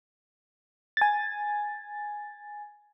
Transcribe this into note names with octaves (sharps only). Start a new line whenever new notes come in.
G#5 A6